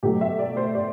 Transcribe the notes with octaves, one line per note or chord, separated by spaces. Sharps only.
B2 F#3 A3 G4
E5
D5
C5
D5